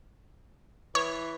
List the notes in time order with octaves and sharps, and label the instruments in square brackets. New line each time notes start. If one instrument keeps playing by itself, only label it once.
[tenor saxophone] E3 [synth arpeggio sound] C#5